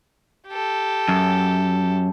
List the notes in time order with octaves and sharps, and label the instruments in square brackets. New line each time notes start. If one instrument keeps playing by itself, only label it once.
[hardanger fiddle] G4 A4
[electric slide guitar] F#2